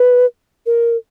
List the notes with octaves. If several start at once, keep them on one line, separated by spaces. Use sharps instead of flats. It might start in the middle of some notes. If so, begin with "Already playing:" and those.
Already playing: B4
A#4